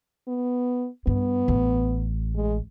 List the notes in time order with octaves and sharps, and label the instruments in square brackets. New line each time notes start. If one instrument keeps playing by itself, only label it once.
[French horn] B3
[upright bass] G2 [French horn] B3
[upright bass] A1
[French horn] G#3